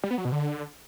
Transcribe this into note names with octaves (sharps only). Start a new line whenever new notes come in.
G3
B3
F#3
B2
D3